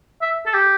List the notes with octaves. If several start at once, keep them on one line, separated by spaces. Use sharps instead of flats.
E5
A4
G4